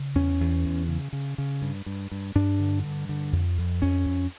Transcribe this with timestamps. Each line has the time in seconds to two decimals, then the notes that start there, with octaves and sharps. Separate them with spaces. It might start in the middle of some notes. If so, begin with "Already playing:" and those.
Already playing: C#3
0.15 E2 C#4
0.41 E2
0.65 E2
0.88 C#3
1.13 C#3
1.38 C#3
1.62 G2
1.86 G2
2.11 G2
2.35 G2 D4
2.60 D3
2.84 G2
3.09 D3
3.33 F2
3.58 F2
3.82 F2 C#4
4.06 F2